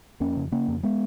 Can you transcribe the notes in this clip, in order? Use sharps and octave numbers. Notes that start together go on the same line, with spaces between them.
F2 A#3 C#4
C#3
C#3 A#3 C#4
F2
G#3 B3